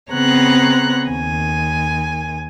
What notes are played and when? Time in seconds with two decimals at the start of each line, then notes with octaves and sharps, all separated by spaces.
0.12 C#3 B3 C4 C#5 A#5 F#6
1.08 D#2 G#5